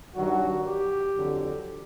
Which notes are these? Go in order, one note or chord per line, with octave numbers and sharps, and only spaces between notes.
G2 D#3 F#3 F#4
G4
F2 D3 F#3